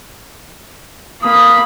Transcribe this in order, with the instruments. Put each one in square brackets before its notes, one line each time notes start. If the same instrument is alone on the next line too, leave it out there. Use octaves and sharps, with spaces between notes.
[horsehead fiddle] A#3 B5 [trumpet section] D#6